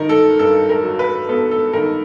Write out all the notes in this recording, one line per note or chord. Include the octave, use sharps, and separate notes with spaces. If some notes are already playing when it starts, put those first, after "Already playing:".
Already playing: G2 D#3 A#4
A4
G2 A4
A#4
F#3
B4
B3 A4
A4
D#3 A#4